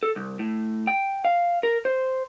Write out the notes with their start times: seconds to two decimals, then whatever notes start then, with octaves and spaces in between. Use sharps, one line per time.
0.03 A4
0.16 C2
0.39 A2
0.87 G5
1.25 F5
1.63 A#4
1.85 C5